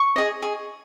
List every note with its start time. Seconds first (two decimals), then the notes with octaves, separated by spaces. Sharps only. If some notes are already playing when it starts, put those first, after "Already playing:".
Already playing: C#6
0.16 G#4 D#5
0.42 G#4